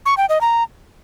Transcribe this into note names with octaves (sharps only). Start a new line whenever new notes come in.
C#6
G5
D#5
A#5